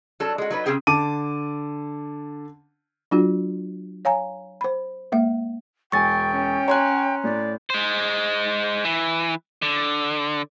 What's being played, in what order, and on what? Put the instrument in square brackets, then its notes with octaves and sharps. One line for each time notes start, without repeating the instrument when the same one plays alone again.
[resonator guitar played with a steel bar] F#3 D4 A4
G#3 F#4
F#3 D#4 B4
C#3 C4 G4 G#4 G5
[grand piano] D3 A5 D6 D#7
[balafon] F#3 D4 F4 F#4
C#5 F5 G#5 A#5
C5 B5
G#3 A#3 E5
[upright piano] E1 G#5 [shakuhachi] G5 [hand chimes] C#6 A6
[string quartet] C#4
[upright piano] C#5 G#5 [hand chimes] A#5 C6 F#6
[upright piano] A2 [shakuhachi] D5
[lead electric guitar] G#3 C5
E3
D3